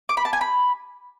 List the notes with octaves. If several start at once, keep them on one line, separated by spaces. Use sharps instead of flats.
D6
B5
A5
G#5
B5